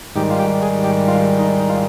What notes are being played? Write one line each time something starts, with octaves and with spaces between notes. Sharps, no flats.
G#2 D#3 G3 G4
F4
G4
G#4
G4
F4
D#4
D#4
F4